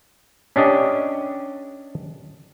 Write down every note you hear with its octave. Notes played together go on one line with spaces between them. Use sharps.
C#4 D4 G4 D#5